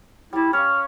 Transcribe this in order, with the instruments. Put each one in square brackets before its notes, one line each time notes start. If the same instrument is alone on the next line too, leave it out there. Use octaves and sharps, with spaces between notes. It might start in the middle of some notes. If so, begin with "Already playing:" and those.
[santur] G3 D5 [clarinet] E4
[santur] C#4 C#5 F5 [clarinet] F6